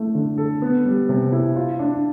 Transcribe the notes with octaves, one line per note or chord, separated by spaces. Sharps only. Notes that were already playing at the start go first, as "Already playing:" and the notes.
Already playing: A3 E4
D3
A4
B3
G3
C3
E4
F4
D4